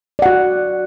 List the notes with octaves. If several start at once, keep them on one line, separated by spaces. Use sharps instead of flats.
F#4 D5 F#5